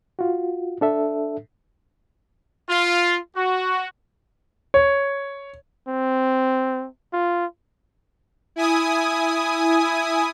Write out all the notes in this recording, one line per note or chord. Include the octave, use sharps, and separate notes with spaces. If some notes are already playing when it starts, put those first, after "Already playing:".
F4 F#4
D4 A4 E5
F4
F#4
C#5
C4
F4
E4 G#5 D#6